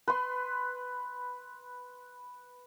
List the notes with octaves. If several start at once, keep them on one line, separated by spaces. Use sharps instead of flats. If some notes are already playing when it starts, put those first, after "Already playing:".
B4 C6